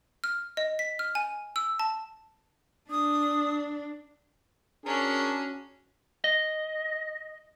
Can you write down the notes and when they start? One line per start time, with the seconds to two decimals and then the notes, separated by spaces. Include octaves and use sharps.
0.24 F6
0.57 D#5
0.79 B6
0.99 F6
1.15 G#5
1.56 E6
1.79 A5
2.91 D4 D#6
4.86 C#4 D4 F#4 G#4 A#4 G#5
6.24 D#5